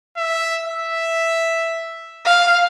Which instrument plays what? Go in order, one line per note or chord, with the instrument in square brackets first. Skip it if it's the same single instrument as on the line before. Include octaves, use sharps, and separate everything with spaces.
[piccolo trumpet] E5
E5
[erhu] F5